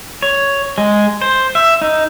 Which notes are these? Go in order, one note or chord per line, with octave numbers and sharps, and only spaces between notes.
C#5
G#3
C5
E5
D#4